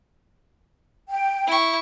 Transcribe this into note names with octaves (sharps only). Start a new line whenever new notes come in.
G5
E4 C#6